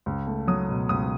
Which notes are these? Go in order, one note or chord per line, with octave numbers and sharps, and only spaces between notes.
C#2
A3
F#3 D#6
B2
C#2 D#6